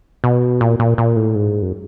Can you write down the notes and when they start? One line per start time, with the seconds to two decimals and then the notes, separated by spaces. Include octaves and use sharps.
0.24 B2
0.61 A#2
0.80 A#2
0.98 A#2
1.16 A2
1.35 G#2
1.62 F#2